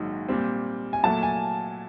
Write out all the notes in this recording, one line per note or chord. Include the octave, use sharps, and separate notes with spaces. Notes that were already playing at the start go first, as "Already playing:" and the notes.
Already playing: A#1 G#2 D#3 F#3
A#2 G3 C4
G#5
A#2 F#3 A3 A5
G#5